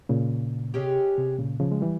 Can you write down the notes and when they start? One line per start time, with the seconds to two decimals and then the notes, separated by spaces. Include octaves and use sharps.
0.09 A#2 C#3
0.74 C3 G#3 C#4 G4
1.18 C3
1.38 A#2 C#3
1.60 C#3 F3
1.72 G#3
1.81 E3 G3